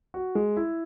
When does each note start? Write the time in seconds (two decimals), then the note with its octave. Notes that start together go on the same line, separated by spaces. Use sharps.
0.14 F#4
0.35 G#3
0.57 E4